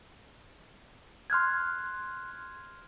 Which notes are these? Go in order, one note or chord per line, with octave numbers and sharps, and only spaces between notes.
C6 F6 F#6 G#6